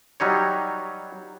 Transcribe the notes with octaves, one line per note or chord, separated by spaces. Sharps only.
F#3 G3 D#4 C#5